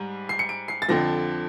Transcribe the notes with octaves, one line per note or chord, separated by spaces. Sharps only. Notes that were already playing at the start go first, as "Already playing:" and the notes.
Already playing: G#2 G3
C7
C#7
D7
C7
A6
F2 D3 F3 A#6